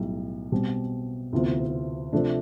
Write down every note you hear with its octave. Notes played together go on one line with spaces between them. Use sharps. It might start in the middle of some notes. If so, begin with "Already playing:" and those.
Already playing: B1 A2 G3
B2 G3 C4
D2 C3 E3 B3 F4
C3 F3 A3 D4